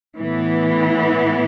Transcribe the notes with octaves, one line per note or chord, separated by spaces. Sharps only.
A2 E3 B3 E4